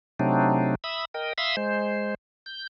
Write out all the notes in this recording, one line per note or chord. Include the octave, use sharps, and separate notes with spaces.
C3 F#3 A3 C4 D4 D#4
E5 B5 D#6 E6
A#4 D#5 G5
E5 F5 B5 C6 D#6 E6
G#3 C5
G6